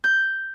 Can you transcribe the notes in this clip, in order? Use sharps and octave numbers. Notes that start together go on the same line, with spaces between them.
G6